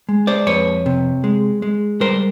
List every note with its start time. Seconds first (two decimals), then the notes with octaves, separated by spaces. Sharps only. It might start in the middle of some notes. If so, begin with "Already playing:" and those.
0.09 G#3
0.27 C5 D5
0.47 F2 B4 C#5
0.86 C3
1.24 G#3
1.62 G#3
2.00 G3 A#4 C5